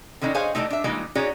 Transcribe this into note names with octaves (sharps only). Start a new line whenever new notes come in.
D3 D#3 C#4 D#4
G#4 C5 C#5 D#5 F5 G#5
E3 F#3 G3 A3 D#4
D4 E5
E3 G3 G#3 A#3 D#4 F4
C#4 D#4 F#4 G#4 C#5 D5